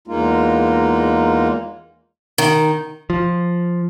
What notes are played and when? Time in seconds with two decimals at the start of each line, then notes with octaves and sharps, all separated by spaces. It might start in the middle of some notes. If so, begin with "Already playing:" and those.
0.08 E2 G#3 A#3 D#4 F4
2.38 D#3
3.10 F3